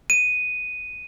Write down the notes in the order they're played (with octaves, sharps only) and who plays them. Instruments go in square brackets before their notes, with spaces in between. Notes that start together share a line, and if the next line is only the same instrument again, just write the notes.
[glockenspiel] D#7